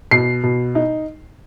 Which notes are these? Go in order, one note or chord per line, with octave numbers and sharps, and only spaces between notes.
B2 C7
B2
D#4